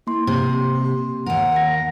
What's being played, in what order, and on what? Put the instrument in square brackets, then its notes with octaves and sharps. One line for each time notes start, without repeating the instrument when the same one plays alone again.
[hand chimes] A#3 C6 [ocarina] E4
[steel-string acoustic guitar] C3 [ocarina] G4
[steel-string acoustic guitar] D#2 A#4 [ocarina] F#5
[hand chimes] A#6